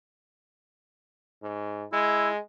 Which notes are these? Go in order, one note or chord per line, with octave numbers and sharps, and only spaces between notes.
G#2
G#3 E4